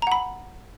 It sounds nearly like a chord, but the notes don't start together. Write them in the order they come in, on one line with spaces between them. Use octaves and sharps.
A#5 F#5 B5